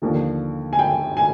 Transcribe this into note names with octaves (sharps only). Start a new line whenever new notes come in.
D#2 D3 F3
G#5
G5
G#5